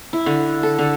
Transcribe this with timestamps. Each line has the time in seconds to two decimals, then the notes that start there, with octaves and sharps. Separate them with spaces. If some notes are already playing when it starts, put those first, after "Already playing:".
0.13 E4
0.26 D3
0.63 A4
0.79 D3